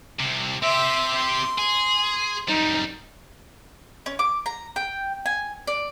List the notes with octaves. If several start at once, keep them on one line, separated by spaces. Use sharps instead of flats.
C2 C3
C4 G4 E5 C6
C6
G#4
F#2 G3 D#4
C#4
D6
A#5
G5
G#5
D5